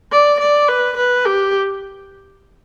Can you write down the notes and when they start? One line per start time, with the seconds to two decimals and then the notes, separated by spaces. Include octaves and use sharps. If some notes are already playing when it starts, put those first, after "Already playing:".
0.12 D5
0.40 D5
0.68 B4
0.97 B4
1.25 G4